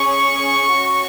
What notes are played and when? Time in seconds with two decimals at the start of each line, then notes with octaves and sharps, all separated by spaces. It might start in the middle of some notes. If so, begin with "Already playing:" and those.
Already playing: C#4 G#4 C#6
0.72 C#4 F#4